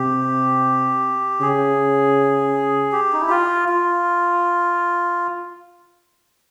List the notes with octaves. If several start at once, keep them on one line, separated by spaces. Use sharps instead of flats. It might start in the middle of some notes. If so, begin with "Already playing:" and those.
Already playing: C3 G4
C#3 G#4
G4
D#4
E4
F4
F4